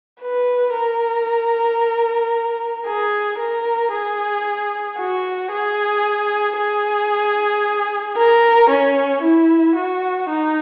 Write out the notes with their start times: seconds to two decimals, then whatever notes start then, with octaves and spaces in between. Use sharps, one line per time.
0.21 B4
0.75 A#4
2.87 G#4
3.39 A#4
3.92 G#4
4.99 F#4
5.52 G#4
6.57 G#4
8.16 A#4
8.70 C#4
9.22 E4
9.76 F#4
10.29 D#4